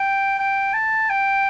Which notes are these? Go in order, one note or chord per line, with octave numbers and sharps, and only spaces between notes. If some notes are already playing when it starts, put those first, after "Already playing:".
Already playing: G5
G5
A5
G5